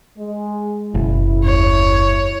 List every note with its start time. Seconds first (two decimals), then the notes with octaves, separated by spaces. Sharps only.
0.17 G#3
0.94 F#1 B2 E4
1.45 D#2 C#5